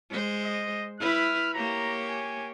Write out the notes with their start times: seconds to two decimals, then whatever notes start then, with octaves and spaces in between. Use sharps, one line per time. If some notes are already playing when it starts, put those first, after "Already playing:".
0.10 G#3 C5
0.45 D#5
1.00 E4 B4 F6
1.54 A#3 G4 C#5 A#5
2.09 G#5